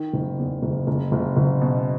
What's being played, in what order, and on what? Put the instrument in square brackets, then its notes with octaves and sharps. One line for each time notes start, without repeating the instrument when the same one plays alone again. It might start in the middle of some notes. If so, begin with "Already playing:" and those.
Already playing: [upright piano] D#3
F#1
E2
F#1
F#1
F#1
F#1
B2